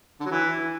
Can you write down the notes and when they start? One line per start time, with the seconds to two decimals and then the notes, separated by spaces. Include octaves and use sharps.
0.20 D3
0.25 F#3
0.31 E3